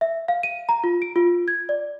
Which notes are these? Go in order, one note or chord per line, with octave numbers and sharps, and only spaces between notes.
E5
F5
D#7
A#5
F4
D7
F4
G#6
D5